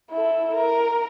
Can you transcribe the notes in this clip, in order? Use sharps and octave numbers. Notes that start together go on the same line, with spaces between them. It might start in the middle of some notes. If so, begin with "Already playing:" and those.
E4 A4
A#4